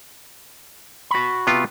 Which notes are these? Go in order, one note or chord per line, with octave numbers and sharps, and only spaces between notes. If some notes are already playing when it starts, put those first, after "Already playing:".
F#4 B5
C3 B3 F4